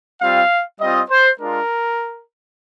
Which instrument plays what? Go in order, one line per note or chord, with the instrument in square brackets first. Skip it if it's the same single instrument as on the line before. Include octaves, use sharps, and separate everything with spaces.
[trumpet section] G3 C4 F4 F5
G3 C4 F4 D#5
C5
G#3 D4 F4 A#4